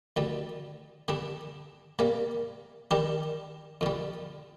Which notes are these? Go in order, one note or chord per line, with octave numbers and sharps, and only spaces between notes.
D2 D3 G3
D3 G3 D4
C3 G3 A#3
D#3 G3 D4 G4
F2 D3 G3